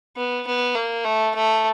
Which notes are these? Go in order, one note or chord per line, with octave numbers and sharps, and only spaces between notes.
B3
B3
A#3
A3
A3